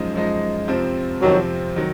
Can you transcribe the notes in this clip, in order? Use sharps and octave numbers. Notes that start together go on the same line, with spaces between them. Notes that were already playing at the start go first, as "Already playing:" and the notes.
Already playing: F#2 F3 G#3 D#4
F#2 F3 G#3 D#4
F2 C3 F3 C4
F2 C3 D#3 F3 F#3 C4
D#3 F#3